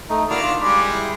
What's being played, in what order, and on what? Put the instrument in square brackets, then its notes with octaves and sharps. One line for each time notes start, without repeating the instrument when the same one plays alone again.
[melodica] A3 D#4
[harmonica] D#3 D4 F5 [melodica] A#3 E4 F#4
[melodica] F4
[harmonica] G3 G#3 [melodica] D5 B5
[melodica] E4